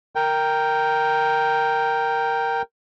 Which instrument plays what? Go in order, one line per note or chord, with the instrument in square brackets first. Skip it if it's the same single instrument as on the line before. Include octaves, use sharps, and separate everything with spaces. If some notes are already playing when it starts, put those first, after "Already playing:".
[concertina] A#4 G5